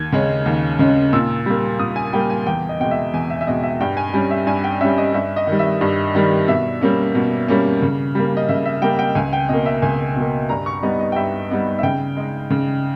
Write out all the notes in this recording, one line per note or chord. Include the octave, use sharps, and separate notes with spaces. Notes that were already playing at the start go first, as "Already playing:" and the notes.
Already playing: D#2 G#6
C#3 G#3 C#4
D#2
C#3 G#3 C#4
A#2 E6
G3 A#3
A#2 D#6
G#5
G3 A#3 G5
G#5
E2 G5
D#5
B2 G#3 G5
E5
E2 G#5
E5
E5
B2 G#3 D#5
E5
G2 G5
G#5
G3 C#4 G#5
E5
G2 G#5
G5
G3 C#4 E5
D#5
G2 E5
D#5
D#3 G3
E5
G2
D#3 G3
B2 E5
G3 A#3 C#4
B2
G3 A#3 C#4
C#3
G3 A#3
D#5
C#3 E5
E5
G3 A#3 G5
G5
C#2 G#5
G5
B2 A#3 D#5
E5
C#2 G#5
B2 A#3
G2 A#5
C#6
G3 B3 D#4 D#5
D#5
G5
G2 E5
G3 B3 D#4
E5
C#3 G5
G#3 D#4
C#3